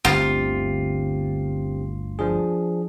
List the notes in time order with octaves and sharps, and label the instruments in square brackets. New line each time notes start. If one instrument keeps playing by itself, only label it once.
[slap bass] G1 D2 [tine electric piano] C4 G4 [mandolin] F4
[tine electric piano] F3 D4 G#4